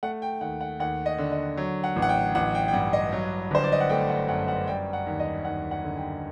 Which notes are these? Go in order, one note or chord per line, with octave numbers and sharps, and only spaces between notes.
A3 F#5
G5
D#2 F#5
F#5
D#2 F#5
D#5
D3
D#5
F#3
F#5
A1
F#5
G5
A1 F#5
G5
G5
G2 F#5
D#5
F#3
G1 C5
D5
D#5
F#5
A3 G5
F#5
F#2 F#5
F#5
G3 G5
F#5
D#2
D#5
D#2 F#5
F#5
D3
G5